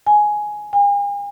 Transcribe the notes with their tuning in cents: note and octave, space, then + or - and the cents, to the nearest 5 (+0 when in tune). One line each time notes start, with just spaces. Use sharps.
G#5 +10
G#5 -45